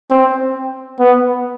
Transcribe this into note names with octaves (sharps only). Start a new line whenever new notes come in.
C4
B3